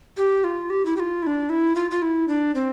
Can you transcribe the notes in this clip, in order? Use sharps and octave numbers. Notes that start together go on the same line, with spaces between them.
G4
F4
G4
E4
G4
F4
E4
D4
E4
F4
F4
E4
D4
C4